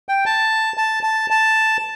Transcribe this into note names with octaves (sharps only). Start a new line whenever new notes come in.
G5
A5
A5
A5
A5